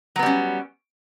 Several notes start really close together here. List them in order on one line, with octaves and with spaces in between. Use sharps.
F#3 B3 G3 C#4